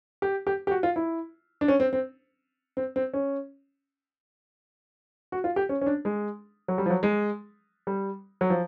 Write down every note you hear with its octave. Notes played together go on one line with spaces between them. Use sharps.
G4
G4
G4
F#4
F4
E4
D4
C#4
C4
C4
C4
C4
C#4
F#4
F4
G4
C#4
C#4
D4
G#3
F#3
G3
F3
F#3
G#3
G3
F#3
F3